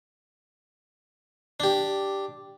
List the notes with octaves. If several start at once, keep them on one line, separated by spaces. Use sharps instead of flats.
D4 G4